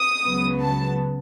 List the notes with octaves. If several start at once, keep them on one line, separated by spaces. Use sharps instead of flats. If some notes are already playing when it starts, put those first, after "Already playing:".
Already playing: D#6
C#2 C#3 F#3 B3
A5